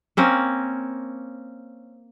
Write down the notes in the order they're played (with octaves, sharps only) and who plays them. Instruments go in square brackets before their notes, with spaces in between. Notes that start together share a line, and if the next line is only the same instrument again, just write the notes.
[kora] A#3 C4 C#4 A#4